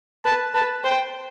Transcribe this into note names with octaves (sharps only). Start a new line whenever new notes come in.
B4 A5
B4 A5
C5 G5